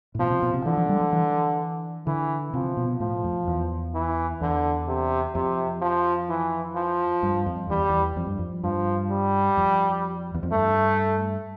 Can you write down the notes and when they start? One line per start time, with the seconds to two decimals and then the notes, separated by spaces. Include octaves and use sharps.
0.15 A2
0.19 B2 F3
0.31 C3
0.43 B2
0.54 C3
0.66 D3 E3
0.78 F3
0.89 G3
1.01 F3
1.13 E3
2.07 D3 E3
2.54 C3 F3
2.77 B2
3.00 A2 F3
3.24 F2
3.48 E2
3.94 E3
4.41 E2 D3
4.88 C3
5.35 F2 C3
5.82 F3
6.29 E3
6.75 F3
7.23 G2
7.46 F2
7.70 E2 G3
7.89 E2
8.16 F2
8.27 G2
8.39 F2
8.64 G2 F3
9.11 G3
9.57 F2
10.34 E2
10.43 F2
10.51 G2 A3